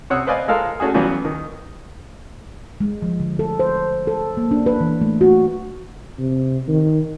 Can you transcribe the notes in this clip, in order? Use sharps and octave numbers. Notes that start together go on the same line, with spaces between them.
C3 C#5 F#5 D#6 E6
B4 C5 D5 D#5 F5 G#5
G#3 F4 A4 A#4 F5
A3 C#4 F#4 G#4
E3 F#3 G3 B3 C#4 F4
D#3
G#3
F3
D3
A4
C5
A4
A#3
D4
B4
E3
A3
F#4
C3
D#3